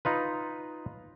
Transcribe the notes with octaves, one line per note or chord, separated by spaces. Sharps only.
D#4 F4 B4